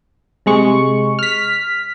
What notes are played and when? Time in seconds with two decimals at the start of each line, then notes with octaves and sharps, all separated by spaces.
0.46 C3 G#3 C#6
1.19 F6 B6